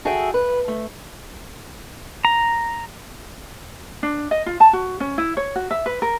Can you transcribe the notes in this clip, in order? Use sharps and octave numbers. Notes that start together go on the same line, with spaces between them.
F#4 G#4 A4 E5 G5
B4
A3
A#5
D4
D#5
F4
A5
F#4
C#4
E4
C#5
F#4
E5
B4
A#4